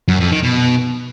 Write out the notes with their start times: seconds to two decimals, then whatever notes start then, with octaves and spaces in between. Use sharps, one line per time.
0.08 F#2
0.20 F2
0.32 D#3
0.44 B2